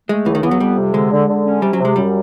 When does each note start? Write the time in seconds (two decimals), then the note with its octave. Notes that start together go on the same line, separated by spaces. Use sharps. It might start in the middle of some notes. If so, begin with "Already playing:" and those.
0.09 G#3 A3
0.25 C#2 E3
0.35 D#3
0.43 E3 B3
0.51 F#3
0.60 F2 G3
0.77 C3
0.93 D3 G#3
1.12 D3
1.28 D3
1.44 C#4
1.62 C3 G3
1.73 F#3
1.80 C3
1.85 G#3
1.96 F#2 G3